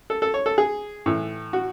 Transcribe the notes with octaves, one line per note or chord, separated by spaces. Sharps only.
A4
A4
C#5
A4
G#4
A2 E3
F#4